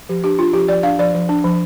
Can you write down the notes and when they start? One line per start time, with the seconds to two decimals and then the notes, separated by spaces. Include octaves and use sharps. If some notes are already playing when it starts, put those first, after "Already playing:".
0.09 F3 G4
0.24 D4 G4
0.39 D4 F4
0.53 F3 G4
0.68 F3 D5
0.83 D4 F5
0.99 F3 D5
1.14 F3
1.29 D4
1.44 F3